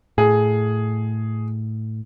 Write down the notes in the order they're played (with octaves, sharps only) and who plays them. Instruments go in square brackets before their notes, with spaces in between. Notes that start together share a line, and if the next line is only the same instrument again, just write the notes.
[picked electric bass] A2 [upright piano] G#4